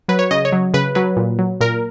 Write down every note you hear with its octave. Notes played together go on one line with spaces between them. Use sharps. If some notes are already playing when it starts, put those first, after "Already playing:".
F#3 B4
C#5
C#3 D#5
C#5
F#3
C#3 B4
F#3 B4
A#2
F#3
A#2 A#4